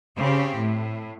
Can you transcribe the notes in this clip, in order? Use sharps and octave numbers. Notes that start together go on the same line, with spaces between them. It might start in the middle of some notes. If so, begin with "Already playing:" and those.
C#3 C4 G4
A2